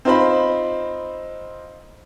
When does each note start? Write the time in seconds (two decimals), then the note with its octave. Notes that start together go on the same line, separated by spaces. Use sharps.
0.05 C4 D#4 F4 C5 D#5 B5